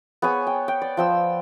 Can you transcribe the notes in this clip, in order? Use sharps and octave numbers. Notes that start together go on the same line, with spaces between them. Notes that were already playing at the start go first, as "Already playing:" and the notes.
B3 G#4 C#5 G#5
G5
G5
D5
F3 G5 E6